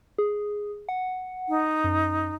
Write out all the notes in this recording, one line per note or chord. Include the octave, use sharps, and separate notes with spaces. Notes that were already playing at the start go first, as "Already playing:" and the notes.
G#4
F#5
D#4
F#2